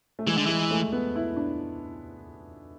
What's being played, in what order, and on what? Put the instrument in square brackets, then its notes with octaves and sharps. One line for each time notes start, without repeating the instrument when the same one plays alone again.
[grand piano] A3
[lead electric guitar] E3 [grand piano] G#3
[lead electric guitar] D3
[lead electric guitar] E3 [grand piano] G#3
[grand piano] A3
B3
E4
D4